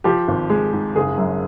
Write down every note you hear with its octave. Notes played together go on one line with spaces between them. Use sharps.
F3 G4
G#1
G#3
G#2
F#1 G#4
F#2